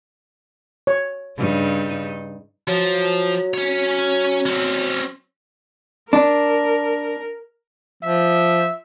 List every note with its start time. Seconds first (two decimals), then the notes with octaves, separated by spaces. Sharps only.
0.87 C#5
1.37 G2 C#3 D#4
2.67 F3 F#3
3.54 C#4 C#5
4.46 C4 C#4
6.13 D4 A#4
8.03 F3 E5